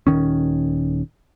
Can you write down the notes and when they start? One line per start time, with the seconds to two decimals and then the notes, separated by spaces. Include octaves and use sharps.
0.07 D#1 B1 D#3 C#4